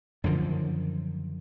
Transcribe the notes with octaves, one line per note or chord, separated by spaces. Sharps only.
F#2 D3 D#3 F3